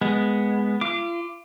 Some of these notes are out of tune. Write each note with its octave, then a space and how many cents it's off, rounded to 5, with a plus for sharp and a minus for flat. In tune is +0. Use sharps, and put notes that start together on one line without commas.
G#3 +0 B3 +0
F4 -35 D6 +0